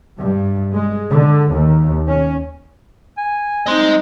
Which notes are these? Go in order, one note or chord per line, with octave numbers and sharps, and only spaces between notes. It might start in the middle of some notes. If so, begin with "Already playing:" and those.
G2
G#3
D3
D#2
C#4
G#5
C4 D#4 D#5 C6